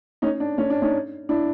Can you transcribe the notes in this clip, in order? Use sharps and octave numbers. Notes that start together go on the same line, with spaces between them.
C#4 D#4
D4
C#4
D4
C#4 D#4
D4 E4